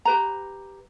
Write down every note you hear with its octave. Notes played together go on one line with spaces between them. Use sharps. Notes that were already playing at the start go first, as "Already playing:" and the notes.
G4 B4 A#5